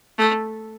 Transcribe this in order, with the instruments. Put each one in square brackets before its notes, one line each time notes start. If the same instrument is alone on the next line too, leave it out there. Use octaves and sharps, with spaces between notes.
[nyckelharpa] A3